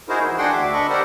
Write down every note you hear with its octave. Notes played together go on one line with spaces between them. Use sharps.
D#4 E4 F#4 G#4 A#4 C5
E3
D4 F#4 G#4 F#5 G5 C6
D2 E5 D6
D4 A4 D#5 B5 C#6
G4 A#4 C5 D5 F#5